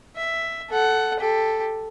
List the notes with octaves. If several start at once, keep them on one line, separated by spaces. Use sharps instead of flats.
E5
A4 F#5
G4 A4